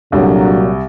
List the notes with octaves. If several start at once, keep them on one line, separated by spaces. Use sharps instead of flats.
C2 A#2 D3 F#3